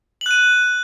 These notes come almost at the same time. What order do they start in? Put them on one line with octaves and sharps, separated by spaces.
F#7 F#6 D#7